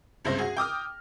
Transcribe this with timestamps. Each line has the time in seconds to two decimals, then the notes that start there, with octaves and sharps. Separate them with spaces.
0.25 F#1 C#2 G2 C3 C5 A#6
0.38 F#4 G#4
0.57 G5 D6 D#6 F6